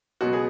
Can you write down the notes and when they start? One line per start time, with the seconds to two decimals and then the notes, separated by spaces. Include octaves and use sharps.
0.21 C#2 B2 F#3 B3 F#4
0.33 G#4